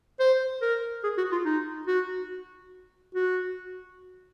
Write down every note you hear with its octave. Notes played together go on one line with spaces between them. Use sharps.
C5
A#4
G#4
F#4
F4
D#4
F#4
F#4